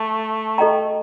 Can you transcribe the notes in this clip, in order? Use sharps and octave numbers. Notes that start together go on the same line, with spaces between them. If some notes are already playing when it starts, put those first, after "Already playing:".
Already playing: A3
A4 D#5 G5 A#5